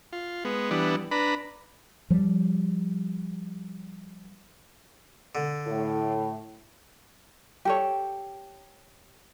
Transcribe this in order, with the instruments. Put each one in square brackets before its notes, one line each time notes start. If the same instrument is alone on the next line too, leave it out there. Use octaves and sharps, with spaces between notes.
[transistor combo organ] F4
G#3 B3
E3 G3 B3 D4
D4 B4 A#5 B5
[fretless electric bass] F3 G3
[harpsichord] D3
[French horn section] A2
[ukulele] G4 A4 C#5